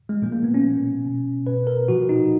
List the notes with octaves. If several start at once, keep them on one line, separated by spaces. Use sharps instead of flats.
G#3
A#2 F3 A#3
A#3
B3
C#4
B2
B2
B2 B4
A#4
A#2 F3 F#4
D#4